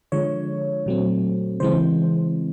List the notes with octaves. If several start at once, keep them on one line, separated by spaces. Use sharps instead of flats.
D3 F3 G#3 C#5
A#2 F#3 A3 C4
C#3 E3 G#3 C4 C5